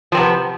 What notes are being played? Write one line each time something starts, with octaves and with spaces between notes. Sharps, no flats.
C3 F3 B3 C4